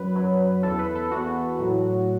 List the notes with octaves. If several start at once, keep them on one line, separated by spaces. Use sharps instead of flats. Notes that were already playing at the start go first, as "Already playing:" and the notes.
Already playing: F#2 F#3 B4
F#2 F#3
E2 E3 A4
B4
A4
E2 E3 F#4
A2 F#3